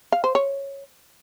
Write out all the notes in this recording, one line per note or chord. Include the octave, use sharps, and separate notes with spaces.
F5
C5
C#5